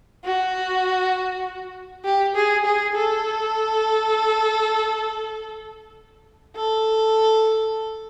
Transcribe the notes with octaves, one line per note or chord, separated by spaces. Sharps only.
F#4
G4
G#4
G#4
A4
A4